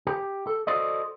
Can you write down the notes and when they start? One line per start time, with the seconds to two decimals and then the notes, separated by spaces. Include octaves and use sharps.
0.07 G4
0.47 A4
0.67 F#4 A4 C5 D5 D#5